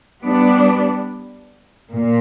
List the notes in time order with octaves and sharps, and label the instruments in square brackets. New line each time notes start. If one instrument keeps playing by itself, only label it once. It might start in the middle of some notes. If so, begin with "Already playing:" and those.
[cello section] G3 B3 D4
A#2